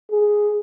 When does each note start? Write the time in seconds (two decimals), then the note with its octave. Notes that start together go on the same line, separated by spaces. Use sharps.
0.11 G#4